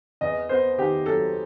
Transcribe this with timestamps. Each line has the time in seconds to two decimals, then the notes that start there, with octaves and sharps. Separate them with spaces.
0.21 E2 D#5
0.49 B3 C5
0.78 D#3 G4
1.06 F#3 A4